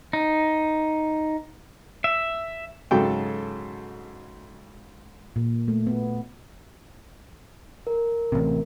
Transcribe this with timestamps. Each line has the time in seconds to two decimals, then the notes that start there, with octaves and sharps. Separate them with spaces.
0.13 D#4
2.04 E5
2.91 G#2 C#3 F#3 A4 G5
5.36 A#2
5.68 A3
5.87 B3
7.87 A#4
8.32 A1 C3